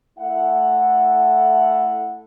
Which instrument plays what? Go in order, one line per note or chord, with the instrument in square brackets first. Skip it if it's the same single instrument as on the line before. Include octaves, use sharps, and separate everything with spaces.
[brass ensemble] A3 E4 A4 E5 F#5